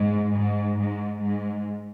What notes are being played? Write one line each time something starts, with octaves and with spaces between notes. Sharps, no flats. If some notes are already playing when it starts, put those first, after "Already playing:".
Already playing: G#2
G#2
G#2
G#2